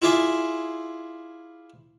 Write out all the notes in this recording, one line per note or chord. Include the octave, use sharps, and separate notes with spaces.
E4 F4 G#4 D5 E5 G#5